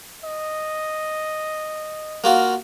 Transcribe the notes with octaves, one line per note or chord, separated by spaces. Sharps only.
D#5
A#3 F4 F#4